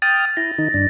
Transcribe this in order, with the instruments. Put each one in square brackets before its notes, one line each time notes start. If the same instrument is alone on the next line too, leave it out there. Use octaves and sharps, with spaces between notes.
[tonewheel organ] G5 D#6 F6 [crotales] A6
[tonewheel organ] E4 [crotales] A#6
[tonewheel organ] D#3 D#4
G2 D4